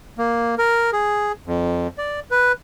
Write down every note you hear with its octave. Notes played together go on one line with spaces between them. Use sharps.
A#3
A#4
G#4
F2
D5
B4